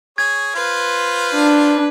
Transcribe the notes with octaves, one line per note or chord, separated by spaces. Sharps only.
G#4 C#5 G#6
F4 B4 C5 F5
D4